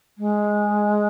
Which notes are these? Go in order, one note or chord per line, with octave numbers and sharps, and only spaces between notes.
G#3